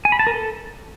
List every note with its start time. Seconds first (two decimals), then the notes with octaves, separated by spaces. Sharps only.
0.05 G#5
0.12 B5
0.19 A5
0.27 A#4
0.34 A4